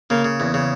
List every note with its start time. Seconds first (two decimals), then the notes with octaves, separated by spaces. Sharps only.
0.10 C#3 A#3
0.25 C#3
0.40 E2
0.54 C#3